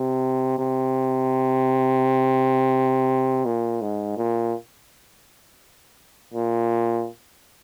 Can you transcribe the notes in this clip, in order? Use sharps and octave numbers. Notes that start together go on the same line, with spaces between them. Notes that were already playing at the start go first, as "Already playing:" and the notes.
Already playing: C3
C3
A#2
G#2
A#2
A#2